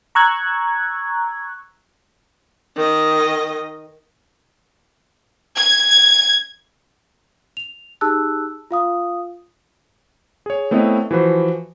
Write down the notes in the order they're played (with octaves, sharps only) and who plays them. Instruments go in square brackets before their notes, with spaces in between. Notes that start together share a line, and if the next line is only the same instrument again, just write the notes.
[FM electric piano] A#5 C#6 E6 F#6 G#6
[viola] D#3 D#5
[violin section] G#6
[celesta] F7
D#4 G4 G#4 A5 E6 F#6
F4 F5 D#6
[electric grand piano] G#4 C#5
A3 B3 C4 E4 C#5 D#5
E3 F3 F#4 B4 C5